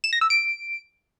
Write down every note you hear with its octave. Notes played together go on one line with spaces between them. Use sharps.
E7
A#6
E6
D7